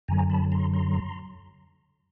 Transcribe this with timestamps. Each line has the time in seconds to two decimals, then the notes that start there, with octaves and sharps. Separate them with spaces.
0.08 F#2 D3 F#3 G#5 A#5
0.30 A5 B5
0.52 A#5 C6
0.73 A#5 C6